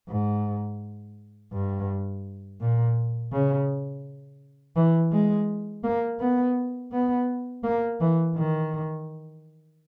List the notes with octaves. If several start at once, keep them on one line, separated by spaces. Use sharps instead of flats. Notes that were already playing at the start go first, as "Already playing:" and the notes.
G#2
G2
A#2
C#3
E3
G#3
A#3
B3
B3
A#3
E3
D#3